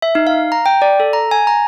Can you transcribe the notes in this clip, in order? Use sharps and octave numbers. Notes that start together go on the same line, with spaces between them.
E5
D#4
F5
A#5
G5
D5
A4
A#5
G#5
A#5